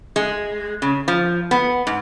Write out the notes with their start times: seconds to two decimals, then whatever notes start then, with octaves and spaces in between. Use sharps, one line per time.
0.16 G#3
0.82 C#3
1.08 F3
1.51 B3
1.87 G#2